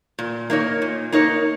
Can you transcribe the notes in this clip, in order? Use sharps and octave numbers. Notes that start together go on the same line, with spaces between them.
A#2
A#3 D#4 A#4 C#5
A#2
A#3 D#4 A#4 C#5